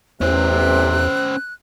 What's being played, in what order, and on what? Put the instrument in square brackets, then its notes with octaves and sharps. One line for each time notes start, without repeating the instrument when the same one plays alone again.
[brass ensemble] A1 C3 [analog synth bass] E2 [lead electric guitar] C#4 C5 [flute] F#6